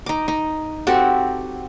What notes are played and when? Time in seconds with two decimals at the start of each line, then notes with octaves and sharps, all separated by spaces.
0.06 D#4 D6
0.28 D#4
0.87 C4 F#4 G4 A4